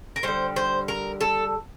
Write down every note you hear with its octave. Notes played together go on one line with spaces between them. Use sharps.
A#4
D3 G3 C5
C5
A#4
A4